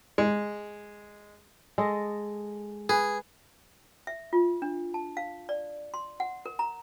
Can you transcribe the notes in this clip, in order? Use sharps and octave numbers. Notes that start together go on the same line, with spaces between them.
G#3
G#3 A4 D#5
G#4 B4
E5
F4
D4
A5
F5
D5
C6
F#5
A#4
A#5